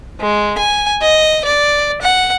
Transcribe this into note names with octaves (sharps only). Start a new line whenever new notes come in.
G#3
G#5
D#5
D5
F#5